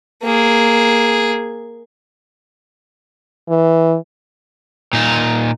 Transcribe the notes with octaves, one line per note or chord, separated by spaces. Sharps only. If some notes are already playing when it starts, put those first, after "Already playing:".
A#3 G#4
E3
A#2 D#4